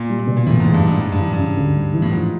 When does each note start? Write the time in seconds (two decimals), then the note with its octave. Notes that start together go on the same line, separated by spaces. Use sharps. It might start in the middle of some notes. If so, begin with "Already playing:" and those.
Already playing: A#2
0.09 G3
0.19 A#2
0.27 B2
0.37 A#2
0.46 E2 A2
0.60 E2 G#2
0.74 G2
0.83 G#2 G3
1.01 G#2 G3
1.12 G2
1.20 E3
1.32 G2
1.38 C#3
1.57 D2
1.76 G3
1.94 E3
2.02 A2
2.12 G#2 F3